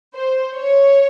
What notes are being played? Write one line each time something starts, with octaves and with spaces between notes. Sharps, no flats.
C5
C#5